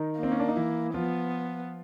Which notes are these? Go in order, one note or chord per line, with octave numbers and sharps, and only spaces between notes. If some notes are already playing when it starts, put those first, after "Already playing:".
Already playing: D#3 D#4
A#3
C4
C#4
D4
D#4
E3 E4
F3 B3 F4